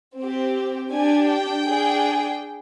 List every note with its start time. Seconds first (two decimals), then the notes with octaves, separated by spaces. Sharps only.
0.19 C4 G4
0.92 D4 G4 G#5
1.29 G5
1.66 D4 G#4